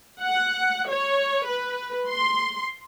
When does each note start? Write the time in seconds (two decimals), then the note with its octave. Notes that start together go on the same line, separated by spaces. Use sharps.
0.20 F#5
0.89 C#5
1.45 B4
2.08 C6